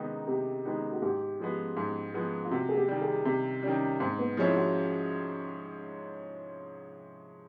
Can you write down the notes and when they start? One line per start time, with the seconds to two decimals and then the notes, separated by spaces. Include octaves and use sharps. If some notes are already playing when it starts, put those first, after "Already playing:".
Already playing: C3 D#3 G#3 B3 D#4
0.27 C3 G4
0.65 D#3 G#3 B3 D#4
0.92 F#4
1.02 G#2 G4
1.40 F3 G#3 B3
1.77 G#2
2.14 F3 G#3 B3
2.45 F4
2.51 C3 F#4
2.69 G#4
2.77 G4
2.88 D#3 G3
3.01 G#4
3.25 C3 G4
3.63 D#3 G3 C#4
4.00 G#2 C4
4.19 B3
4.37 F3 G#3 C4 C#4 E4
4.56 F#4